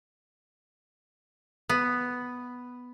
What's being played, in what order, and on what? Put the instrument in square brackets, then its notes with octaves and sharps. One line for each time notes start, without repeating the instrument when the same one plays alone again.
[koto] B3